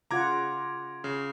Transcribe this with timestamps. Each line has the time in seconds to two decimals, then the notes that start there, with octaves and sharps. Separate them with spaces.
0.11 C#3 F4 F#5 A#5 D6 G#6
1.04 C#3